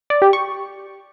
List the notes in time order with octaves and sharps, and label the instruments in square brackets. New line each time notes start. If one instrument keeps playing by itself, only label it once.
[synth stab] D5
G4
C#6